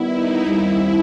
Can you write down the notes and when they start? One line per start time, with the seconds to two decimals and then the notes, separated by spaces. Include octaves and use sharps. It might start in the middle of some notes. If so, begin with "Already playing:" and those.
Already playing: D#3 G3 B3 E4
0.11 D#4
0.44 D#2 D#3 G3 C4 E4